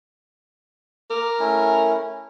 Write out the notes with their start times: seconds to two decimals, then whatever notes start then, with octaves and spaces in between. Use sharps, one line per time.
1.10 A#4 D6
1.40 A3 C#4 E4